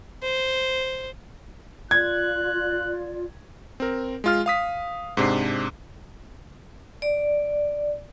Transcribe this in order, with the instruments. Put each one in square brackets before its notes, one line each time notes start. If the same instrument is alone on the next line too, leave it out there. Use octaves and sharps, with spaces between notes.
[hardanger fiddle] C5
[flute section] F4 D5 [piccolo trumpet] F#6 [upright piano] G#6
[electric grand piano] C4 A#4
G#3 F4 F6
F5 D#6 B6
G#2 C3 D4 C7
[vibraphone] D5